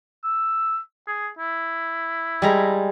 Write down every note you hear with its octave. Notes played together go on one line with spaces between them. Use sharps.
E6
G#4
E4
G3 G#3 A#5